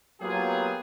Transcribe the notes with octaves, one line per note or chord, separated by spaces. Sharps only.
F#3 A#3 B3 F4 G4 G#4